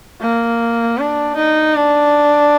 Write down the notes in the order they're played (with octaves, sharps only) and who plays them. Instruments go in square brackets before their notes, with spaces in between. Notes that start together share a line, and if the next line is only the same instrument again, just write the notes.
[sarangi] A#3
D4
D#4
D4